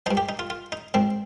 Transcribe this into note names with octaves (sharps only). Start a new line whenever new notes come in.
G2 F3 D#4
G4
D#4
F4
F4
D#4
G#2 F3 C4